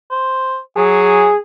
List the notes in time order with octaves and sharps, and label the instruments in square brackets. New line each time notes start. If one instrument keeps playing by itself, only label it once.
[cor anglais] C5
[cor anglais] F#3 [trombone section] G#4